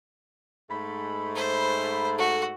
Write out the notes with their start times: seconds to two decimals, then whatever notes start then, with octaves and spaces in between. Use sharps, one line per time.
0.70 G#2 A3 B5
1.36 C5
2.19 F#4 A4